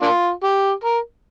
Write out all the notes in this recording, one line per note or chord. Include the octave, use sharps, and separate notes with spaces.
A#3 D4 F4
G4
A#4